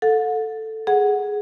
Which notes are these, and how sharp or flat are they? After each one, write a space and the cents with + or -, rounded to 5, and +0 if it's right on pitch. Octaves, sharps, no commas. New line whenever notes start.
A4 +0 F#5 -40
G#4 +0 F#5 +0